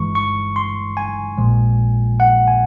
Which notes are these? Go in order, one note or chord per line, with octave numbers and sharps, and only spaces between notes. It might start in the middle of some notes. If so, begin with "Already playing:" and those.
Already playing: G1 G2 E3 G#3 C#6
C#6
C6
G#5
A#1 A#2 F3 G#3
F#5
G#5